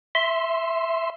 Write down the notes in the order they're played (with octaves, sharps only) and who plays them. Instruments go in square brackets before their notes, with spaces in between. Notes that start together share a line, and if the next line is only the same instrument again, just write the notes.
[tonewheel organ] E5 C6